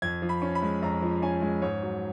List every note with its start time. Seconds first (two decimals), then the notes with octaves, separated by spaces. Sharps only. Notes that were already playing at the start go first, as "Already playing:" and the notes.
0.02 F2 G#6
0.22 F3
0.29 B5
0.42 C#4
0.55 B5
0.62 G#3
0.82 F2 A#5
1.02 F3
1.22 C#4 G#5
1.42 G#3
1.62 G#2 C#5
1.82 F#3